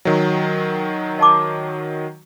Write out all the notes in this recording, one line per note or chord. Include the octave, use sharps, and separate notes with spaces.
D#3 F#3
D#5 A5 D6